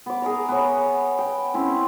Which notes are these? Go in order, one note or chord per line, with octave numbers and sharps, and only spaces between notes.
B3 D6
G#4 A#4 D#5 A#5
B3 C#5
G5
C4 C#4 E4